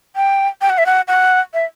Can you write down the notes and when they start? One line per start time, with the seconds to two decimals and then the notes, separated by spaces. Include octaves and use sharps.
0.16 G5
0.61 G5
0.70 F#5
0.78 E5
0.86 F#5
1.08 F#5
1.54 E5